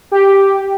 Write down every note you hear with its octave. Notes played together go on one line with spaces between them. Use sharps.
G4